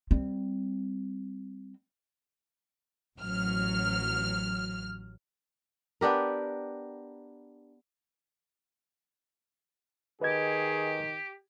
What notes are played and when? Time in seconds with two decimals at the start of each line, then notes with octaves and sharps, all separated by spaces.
0.11 G3 C4
3.17 A1 F#3 F6
6.01 B3 D4 G4 A#4
10.22 D#3 G4 G#4 B4 D#5 G#6